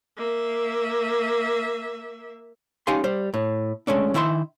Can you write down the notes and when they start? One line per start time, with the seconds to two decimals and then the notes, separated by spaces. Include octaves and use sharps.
0.17 A#3 E5
2.87 C#4 D#4 G4 F5 G#5 C6
3.04 G3 C5
3.34 A2
3.87 G#3 A3 C#4 D4
4.14 D#3 E4 C5 E5 C6